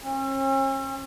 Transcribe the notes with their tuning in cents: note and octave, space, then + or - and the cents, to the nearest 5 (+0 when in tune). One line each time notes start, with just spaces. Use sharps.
C#4 -45